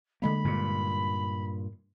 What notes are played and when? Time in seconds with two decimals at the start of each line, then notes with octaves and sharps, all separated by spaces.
0.22 D3 G#3 A#3 B5
0.45 G2 A#2